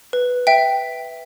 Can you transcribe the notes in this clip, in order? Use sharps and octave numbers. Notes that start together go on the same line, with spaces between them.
B4
E5 G5